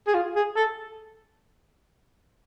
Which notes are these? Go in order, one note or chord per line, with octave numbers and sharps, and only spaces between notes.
G#4
F4
G#4
A4